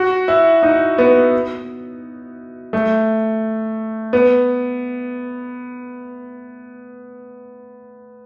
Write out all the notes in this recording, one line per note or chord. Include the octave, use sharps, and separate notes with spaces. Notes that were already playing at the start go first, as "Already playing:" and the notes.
Already playing: F#4
E4
D#4
B3
A3
B3